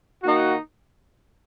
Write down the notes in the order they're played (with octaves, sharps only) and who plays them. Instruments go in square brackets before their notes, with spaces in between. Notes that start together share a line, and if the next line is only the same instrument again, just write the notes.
[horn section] D#3 A#3 D#4 F#4